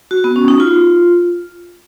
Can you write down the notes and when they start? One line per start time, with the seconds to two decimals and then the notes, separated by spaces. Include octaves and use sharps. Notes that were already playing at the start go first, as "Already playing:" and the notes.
0.11 F#4
0.24 B3
0.36 C#4
0.48 D#4
0.60 F4